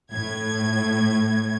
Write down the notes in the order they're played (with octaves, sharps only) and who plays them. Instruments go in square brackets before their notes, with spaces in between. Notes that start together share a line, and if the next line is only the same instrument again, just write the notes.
[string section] A2 G#6